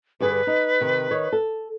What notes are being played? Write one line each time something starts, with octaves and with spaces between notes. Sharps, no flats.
G2 D3 G#4 B4
D#4
C3 D#3
D#3 C#5
A4